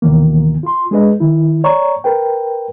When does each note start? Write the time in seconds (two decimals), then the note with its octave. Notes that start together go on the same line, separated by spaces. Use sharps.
0.02 D2 B2 D#3 E3 A#3
0.63 F4 C6
0.91 G#3 D4 G#4 B4 D#5
1.20 D#3 E4
1.64 C#5 D5 A#5 C#6
2.04 A#4 B4 G5